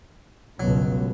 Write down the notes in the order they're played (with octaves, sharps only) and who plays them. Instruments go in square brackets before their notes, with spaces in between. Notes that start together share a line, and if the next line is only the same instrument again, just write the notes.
[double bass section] G1 C#2 B2 [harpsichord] F#3